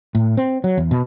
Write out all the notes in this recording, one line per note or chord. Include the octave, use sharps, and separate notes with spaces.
A2
C4
F#3
E2
B2